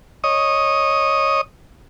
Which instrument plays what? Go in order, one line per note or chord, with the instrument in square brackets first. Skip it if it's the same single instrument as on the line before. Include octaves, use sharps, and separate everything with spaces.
[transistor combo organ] C#5 D#5 D#6